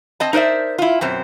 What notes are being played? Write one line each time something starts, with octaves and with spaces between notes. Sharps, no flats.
C4 D#5 A5
D#4 A#4 C5 D5 E5
E4 F4
F#2 B2 C4